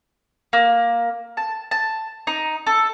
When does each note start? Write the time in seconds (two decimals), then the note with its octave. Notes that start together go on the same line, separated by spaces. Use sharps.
0.53 A#3
1.37 A5
1.71 A5
2.27 D#4
2.67 A4